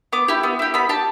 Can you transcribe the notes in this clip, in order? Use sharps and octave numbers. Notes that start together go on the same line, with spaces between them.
B3 D6
E4 G4
B3
E4 G4
B3 B5
G4 A5